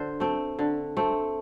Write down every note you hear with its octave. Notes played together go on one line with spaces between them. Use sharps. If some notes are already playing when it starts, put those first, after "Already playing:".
Already playing: D3 C5
A3 C4
D3
A3 C4